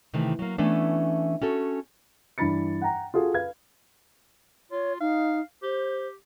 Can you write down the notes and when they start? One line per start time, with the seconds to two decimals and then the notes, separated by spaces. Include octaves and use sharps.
0.14 C3 D#3 E3 A3
0.39 F#3 A#3
0.58 E3 A3 B3 C#4 D4
1.42 C#4 F#4 A4
2.38 G2 E3 B5 A6 C#7
2.81 F#5 G5 A#5
3.14 F4 F#4 G#4 A4
3.34 B4 F5 G#6
4.71 F4 C#5
5.00 D#4 F5
5.63 G4 C5